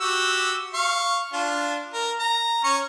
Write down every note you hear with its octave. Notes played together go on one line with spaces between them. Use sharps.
F#4 G4 E6
F5 C#6
D4 F4
A#4
A#5
C#4 C#5 C#6